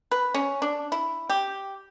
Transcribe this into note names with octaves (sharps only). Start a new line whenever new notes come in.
B4
C#4
D4
E4
G4